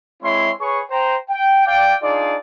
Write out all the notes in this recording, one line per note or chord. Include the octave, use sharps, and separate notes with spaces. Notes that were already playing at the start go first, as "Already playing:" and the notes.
G#3 C4 E4 C#5 E5 C6
G#4 B4 C#5 C#6
C5 G5 A#5
G5
D5 F5 G5
D4 D#4 F4 G#4 D5